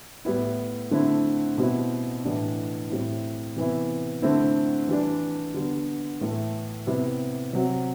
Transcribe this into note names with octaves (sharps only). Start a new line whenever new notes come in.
A2 G3 B3 E4
D3 A3 C4 E4
B2 G3 C4 E4
A2 E3 G3 D4
A2 G3 C4 E4
C3 E3 B3 E4
D3 A3 C4 E4
E3 G3 D4
D3 G3 B3
A2 E3 A3
C3 G3 B3 E4
C3 F#3 C4